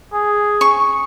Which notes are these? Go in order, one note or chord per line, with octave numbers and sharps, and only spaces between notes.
G#4
C#6